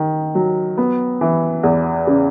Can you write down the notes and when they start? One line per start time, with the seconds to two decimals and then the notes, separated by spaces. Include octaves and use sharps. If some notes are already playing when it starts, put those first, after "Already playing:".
Already playing: D#3
0.35 F#3
0.78 B3
1.21 E3
1.63 E2
2.07 C#3